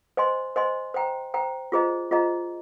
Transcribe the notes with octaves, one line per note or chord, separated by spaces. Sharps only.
C5 D#5 G#5 C6
C5 D#5 G#5 C6
C5 G5 A#5
C5 G5 A#5
F4 G#4 C5 D#5 A#5
F4 G#4 C5 D#5 A#5